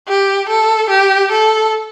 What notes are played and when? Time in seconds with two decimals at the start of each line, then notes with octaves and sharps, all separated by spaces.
0.09 G4
0.49 A4
0.90 G4
1.32 A4